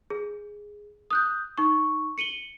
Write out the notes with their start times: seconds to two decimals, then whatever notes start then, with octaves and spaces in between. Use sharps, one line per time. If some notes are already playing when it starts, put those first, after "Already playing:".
0.10 G#4
1.10 D#6 F#6 G6
1.58 D#4 C#6
2.18 C#7 D#7 F#7 G7